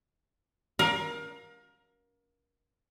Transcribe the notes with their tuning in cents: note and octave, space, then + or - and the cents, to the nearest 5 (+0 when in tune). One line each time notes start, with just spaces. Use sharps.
A#4 +25 F5 +30